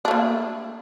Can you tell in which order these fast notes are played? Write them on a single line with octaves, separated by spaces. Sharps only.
D4 A3 A#3